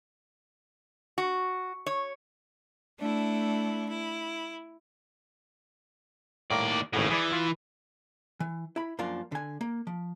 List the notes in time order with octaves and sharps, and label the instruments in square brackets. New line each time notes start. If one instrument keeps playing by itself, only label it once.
[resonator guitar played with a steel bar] F#4
C#5
[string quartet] A3 D4 E4
E4
[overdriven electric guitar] D#2 D5 [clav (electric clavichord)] A2 A#3
[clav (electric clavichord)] G#1 C#3 F#5 [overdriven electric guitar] A2
[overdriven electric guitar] E3 [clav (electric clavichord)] G#4 B4 D5
[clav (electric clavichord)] F4
[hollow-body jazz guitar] E3
E4 B5
F#2 F3 A#3 D4 F4
D3 G#5
A#3
F3